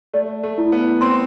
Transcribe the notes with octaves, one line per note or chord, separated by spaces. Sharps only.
A3 D5
A3
E4
B3
C4 C6